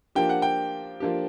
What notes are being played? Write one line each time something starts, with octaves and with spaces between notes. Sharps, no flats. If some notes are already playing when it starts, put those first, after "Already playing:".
F3 A#3 D4 G4 G5
F#5
G5
F3 A#3 D4 G4